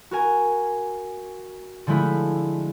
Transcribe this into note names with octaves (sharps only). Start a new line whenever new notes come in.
F#4 A#4 G#5
D3 F3 G#3 A3 E4